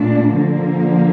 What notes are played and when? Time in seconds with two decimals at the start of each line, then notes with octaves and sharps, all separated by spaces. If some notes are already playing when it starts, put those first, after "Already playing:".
Already playing: A#2 A3 D4
0.33 D3 F3 A#3